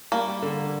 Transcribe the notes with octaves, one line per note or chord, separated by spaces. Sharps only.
G3 A#3
G3
D3